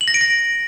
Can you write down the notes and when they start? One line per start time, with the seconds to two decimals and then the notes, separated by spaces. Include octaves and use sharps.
0.01 F#7
0.08 A#6
0.14 D7
0.21 A#6